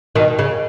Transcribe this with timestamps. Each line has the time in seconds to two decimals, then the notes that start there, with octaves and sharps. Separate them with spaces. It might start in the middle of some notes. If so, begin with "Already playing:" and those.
0.15 B2 D#3
0.39 C#3